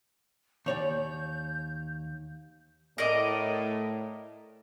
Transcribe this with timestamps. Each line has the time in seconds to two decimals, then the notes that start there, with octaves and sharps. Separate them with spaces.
0.66 D#2 C#5 D5 G6
2.98 A2 A#4 D5 D#5